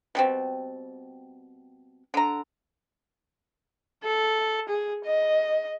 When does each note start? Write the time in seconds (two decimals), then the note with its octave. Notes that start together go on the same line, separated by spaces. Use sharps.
0.15 B2 G3 C4
2.14 D3 A#5
4.04 A4
4.69 G#4
5.05 D#5